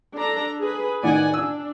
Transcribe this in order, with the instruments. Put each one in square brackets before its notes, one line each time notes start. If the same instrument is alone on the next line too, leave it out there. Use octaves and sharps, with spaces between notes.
[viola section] D4 A4 A#5
G#4 B4
[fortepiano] A2 D#3 [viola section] D5 F#5 G#5
[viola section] D4 [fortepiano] E6